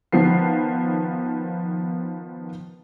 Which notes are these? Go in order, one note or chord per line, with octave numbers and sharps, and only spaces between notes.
D#3 F3 B3 C7